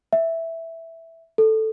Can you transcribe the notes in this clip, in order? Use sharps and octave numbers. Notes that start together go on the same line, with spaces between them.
E5
A4